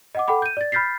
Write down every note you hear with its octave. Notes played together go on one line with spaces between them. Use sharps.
D#5 F#5 D6
A4 F#5 G5 B5 D6
G6 D#7
D5 A6
B5 F6 G6 A6 B6 C7